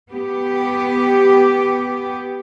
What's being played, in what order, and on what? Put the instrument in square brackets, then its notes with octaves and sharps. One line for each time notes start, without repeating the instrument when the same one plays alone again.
[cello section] B3 G4